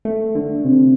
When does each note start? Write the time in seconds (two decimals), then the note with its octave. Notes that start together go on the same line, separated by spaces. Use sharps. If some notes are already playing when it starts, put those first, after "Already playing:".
0.05 A3
0.35 D3
0.64 C3